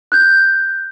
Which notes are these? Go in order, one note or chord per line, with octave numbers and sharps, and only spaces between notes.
F#6 G6